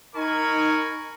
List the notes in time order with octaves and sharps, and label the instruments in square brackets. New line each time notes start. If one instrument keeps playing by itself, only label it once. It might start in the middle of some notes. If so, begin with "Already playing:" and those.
[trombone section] D#4 [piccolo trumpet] A#4 [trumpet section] G#5 B5 C#6